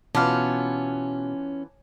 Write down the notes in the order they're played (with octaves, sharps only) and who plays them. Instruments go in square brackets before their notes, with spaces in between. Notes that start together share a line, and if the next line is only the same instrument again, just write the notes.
[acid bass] B2 [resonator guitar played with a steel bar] E3 B3 F4 [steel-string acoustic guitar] C#4 [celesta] A5 D6 F6